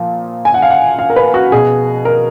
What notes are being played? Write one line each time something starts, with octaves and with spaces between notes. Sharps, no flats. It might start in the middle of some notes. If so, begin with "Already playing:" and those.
Already playing: A#2 F3
G#5
F#5
F5
F#5
F5
A#4
B4
F#4
B2 G#4
A#4